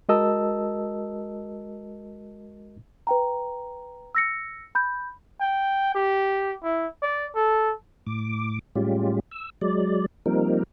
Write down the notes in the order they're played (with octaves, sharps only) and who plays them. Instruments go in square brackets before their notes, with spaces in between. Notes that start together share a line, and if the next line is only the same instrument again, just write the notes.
[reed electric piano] G#3 F#4 A#4 D#5 A5 E6
[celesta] B4 G5 A#5
E6 A#6 C#7
B5 G6
[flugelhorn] G5
G4
E4
D5
A4
[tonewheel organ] A2 D6
A2 G3 G#3 C#4 F4 G4
E6
F#3 G#3 D5
F3 G3 A#3 C4 D#4 A#4